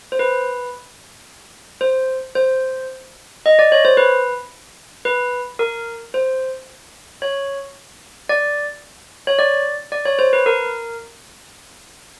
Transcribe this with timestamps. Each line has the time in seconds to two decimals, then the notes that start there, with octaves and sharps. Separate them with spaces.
0.12 C5
0.19 B4
1.81 C5
2.35 C5
3.46 D#5
3.59 D5
3.72 C#5
3.85 C5
3.97 B4
5.05 B4
5.59 A#4
6.14 C5
7.22 C#5
8.29 D5
9.27 C#5
9.39 D5
9.92 D5
10.06 C#5
10.19 C5
10.33 B4
10.46 A#4